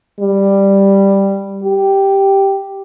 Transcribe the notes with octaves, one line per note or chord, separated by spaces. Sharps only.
G3
G4